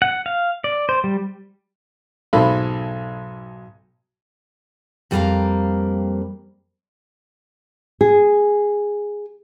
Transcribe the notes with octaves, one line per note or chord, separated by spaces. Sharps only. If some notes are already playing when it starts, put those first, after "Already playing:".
F#5
F5
D5
C5
G3
B1 G#2 A4 B5
F2 G3 A#3 B3 F5 A#5
G#4